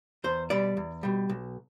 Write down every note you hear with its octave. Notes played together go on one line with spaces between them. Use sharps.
E2 C5
B2 G3 D5
E2
B2 G3
B1